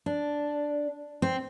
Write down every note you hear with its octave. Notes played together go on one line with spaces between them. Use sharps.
D4
C4